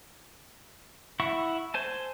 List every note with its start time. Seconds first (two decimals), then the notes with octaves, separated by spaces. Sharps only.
1.20 E4 F#5 C#6
1.74 C5 G#5 A5